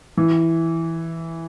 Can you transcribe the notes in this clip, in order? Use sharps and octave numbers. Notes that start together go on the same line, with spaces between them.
E3